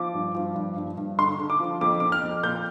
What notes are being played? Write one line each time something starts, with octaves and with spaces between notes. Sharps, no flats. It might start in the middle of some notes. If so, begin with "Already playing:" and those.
Already playing: F3 D6
G2
F3
G2
G2
G2
D3 C6
D3
D6
F3
F2 D6
F2 D6
F6
F2
A#2 G6